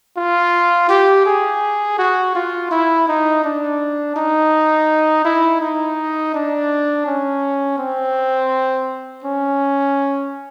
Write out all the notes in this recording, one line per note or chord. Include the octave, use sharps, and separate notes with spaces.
F4
G4
G#4
F#4
F4
E4
D#4
D4
D#4
E4
D#4
D4
C#4
C4
C#4